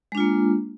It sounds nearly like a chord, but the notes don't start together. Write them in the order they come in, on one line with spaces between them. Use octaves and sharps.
G#3 D4 F4 A#3